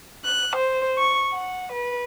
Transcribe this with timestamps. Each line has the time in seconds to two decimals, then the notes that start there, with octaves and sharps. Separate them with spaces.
0.24 F#6
0.56 C5
0.99 C#6
1.32 F#5
1.73 B4